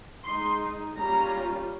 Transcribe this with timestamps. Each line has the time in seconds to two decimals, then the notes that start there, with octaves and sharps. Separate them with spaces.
0.24 G#3 D#4 C6
0.96 G3 A#3 C#4 F4 A#5